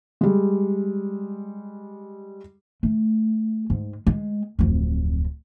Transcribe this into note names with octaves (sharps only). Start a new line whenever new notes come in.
G3 G#3
A3
G#2
G#3
D1 F2